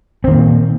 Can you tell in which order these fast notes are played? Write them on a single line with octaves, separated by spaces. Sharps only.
C4 D#3 A#3 A#2